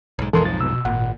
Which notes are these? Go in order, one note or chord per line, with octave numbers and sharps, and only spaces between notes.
B1 G#2
B1 F2 G#2 E3 A4 A#4 C6
F3 A6
B2 E6
G#1 A#2 F#5